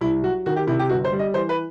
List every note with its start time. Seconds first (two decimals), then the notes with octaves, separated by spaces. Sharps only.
0.01 C2 E4
0.23 F#3 F#4
0.46 D#3 F#4
0.56 G4
0.67 C3 E4
0.79 G4
0.89 G1 F#4
1.05 C5
1.12 G3
1.19 D#5
1.34 E3 C5
1.49 B4